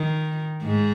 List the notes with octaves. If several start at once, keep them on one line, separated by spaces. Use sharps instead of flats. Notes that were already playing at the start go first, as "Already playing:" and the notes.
Already playing: D#3
G#2 G#3